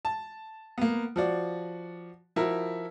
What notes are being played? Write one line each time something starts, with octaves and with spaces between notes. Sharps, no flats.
A5
A#3 B3
F3 F#4 D5
F3 E4 F#4 A#4